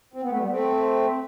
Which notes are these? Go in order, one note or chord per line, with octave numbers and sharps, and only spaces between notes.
C4
B3
A3
G3 B3
A3 C4